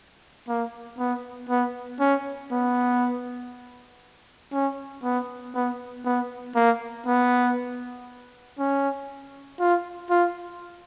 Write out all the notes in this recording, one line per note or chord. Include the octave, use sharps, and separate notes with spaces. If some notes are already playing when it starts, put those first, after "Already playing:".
A#3
B3
B3
C#4
B3
C#4
B3
B3
B3
A#3
B3
C#4
F4
F4